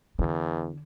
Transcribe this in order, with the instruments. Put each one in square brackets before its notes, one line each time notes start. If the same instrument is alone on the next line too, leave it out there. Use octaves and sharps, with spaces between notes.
[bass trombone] E2 [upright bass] D3